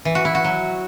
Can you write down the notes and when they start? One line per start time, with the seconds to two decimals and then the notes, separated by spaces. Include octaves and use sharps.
0.05 E3
0.15 F#4
0.25 E4
0.35 F#4
0.44 F#3